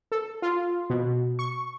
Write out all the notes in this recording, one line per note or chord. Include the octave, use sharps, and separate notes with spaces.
A4
F4
B2
C#6